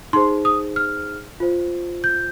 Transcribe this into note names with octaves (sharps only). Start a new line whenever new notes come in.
D#4 G#4 C5 C6
D#6
F6
F4 C5
G6